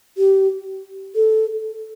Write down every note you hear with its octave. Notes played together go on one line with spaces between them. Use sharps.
G4
A4